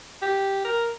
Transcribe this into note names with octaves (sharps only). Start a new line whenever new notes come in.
G4
A#4